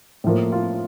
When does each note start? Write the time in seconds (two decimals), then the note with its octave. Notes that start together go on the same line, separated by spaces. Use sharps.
0.24 A2 F3 A#3
0.52 F4